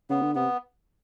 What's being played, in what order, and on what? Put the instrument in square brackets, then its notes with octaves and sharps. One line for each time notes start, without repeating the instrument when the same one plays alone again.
[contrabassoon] C#3 [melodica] B3
[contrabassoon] D3
[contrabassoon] C3 [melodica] B3